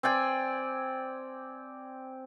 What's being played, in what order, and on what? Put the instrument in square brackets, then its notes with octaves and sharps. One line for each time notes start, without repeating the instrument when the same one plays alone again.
[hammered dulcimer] C4 D5 G5 G#5